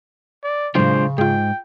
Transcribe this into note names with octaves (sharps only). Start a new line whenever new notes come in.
D5
A2 C#3 F#3 G#3 D4 F4 C5
G#2 F4 G#4 G5